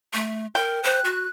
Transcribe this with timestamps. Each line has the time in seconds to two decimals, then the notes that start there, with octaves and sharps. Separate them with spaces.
0.13 A3
0.55 A#4 G5
0.84 C5 F#6
1.05 F#4